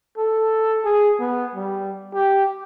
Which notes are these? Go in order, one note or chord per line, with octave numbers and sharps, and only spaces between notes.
A4
G#4
B3
G3
G4